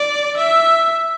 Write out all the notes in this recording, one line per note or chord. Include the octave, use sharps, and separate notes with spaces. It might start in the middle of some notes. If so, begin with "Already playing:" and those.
Already playing: D5
E5